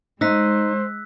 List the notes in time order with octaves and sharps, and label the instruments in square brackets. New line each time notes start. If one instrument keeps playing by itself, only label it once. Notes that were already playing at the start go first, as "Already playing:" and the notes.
[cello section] G#3 [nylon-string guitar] D#4 [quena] C5 [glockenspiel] E6 F#6 B6